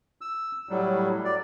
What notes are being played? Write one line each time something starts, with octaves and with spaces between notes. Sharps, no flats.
E6
A2 F#3 G3
D5